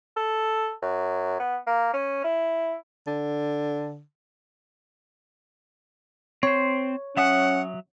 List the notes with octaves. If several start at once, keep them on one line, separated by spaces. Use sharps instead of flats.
A4
F#2
B3
A#3
C#4
E4
D3
C4 C5 C#5
F#3 C#4 E5 F#5 D#6